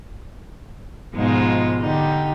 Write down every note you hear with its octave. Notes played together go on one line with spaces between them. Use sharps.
G#2 B2 F3 G#3 D#4 F4
D3 G3 D#4 G4